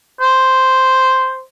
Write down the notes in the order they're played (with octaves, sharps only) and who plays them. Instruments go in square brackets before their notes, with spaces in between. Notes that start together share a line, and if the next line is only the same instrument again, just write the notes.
[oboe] C5